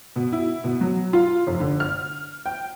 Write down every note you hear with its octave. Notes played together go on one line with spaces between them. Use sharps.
B2
E4
B2
F#3
F4
F1
D3
F6
G5